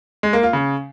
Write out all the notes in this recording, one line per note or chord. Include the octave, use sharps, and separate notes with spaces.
G#3
A#3
F4
C#3